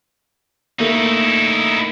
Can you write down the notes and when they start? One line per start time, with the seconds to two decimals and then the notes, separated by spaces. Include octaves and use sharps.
0.79 A3 A#3 D#4 E4